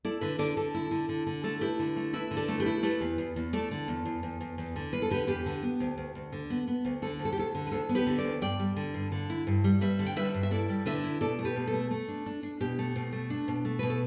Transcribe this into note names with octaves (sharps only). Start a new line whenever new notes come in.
E4 A4 D5
D3 B4 E5
D3 A4 D5
D3 A4
E4
D3
D3
D3
A3 A4
E4 G4 B4
D3
A3
E4 B4 E5
D3
A4 D5
A3
G4 B4
E4
A3 G4 B4
E2
E2
E2
A3 A4 D5
D3
E2
E2
E2
E2
E2
D3
E2 B4
A4
D3 G4 B4
E2 G4 B4
D3
B3
D2
D2
D2
D3
B3
B3
D2
D3 A4
D2
A4
G4
D2 A4
D3
B4
D2 A4
B3
G4 B4
D3
A4 D5
D2
G2 D5 G5
G3
D3
G2
D3
E4
G2
G3
G3 B4 E5
D3
G5
G3 B4 E5
G2
E5
E4 A4 D5
G3
D3 B4 E5
E4
B2 A4 D5
A3
G4 B4
B2
A4
A3
A3
D4
D4
D4
B2 G4
A3
B2
A3
D4
B2
A3
B2 B4
A4